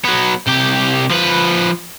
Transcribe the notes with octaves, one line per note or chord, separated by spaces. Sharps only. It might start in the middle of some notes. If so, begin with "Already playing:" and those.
F#3 B3
C2 G4
F3 B4